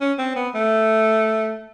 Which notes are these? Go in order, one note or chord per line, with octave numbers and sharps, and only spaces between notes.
C#4
C4
B3
A3